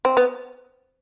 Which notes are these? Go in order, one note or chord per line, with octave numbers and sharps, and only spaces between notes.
C4
B3